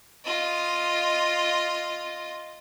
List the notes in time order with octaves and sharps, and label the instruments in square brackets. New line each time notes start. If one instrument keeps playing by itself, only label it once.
[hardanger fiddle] F4 D#5